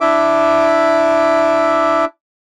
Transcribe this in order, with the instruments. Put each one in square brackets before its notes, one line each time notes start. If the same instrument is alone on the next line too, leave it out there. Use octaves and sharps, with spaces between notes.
[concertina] D4 E4 E5 D6